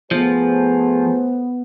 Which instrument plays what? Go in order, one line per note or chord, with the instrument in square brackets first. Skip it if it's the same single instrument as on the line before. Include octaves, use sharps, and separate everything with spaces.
[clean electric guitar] F3 [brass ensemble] A3 G#4 C5 [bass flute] B3